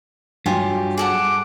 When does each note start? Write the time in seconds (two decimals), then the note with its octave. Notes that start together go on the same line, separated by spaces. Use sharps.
0.46 G2 F#3 F4 G4 G#5
0.98 G#4 A4 F#5 D6